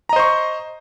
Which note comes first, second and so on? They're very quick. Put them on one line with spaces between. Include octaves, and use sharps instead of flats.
A#5 D#5 C5 C#6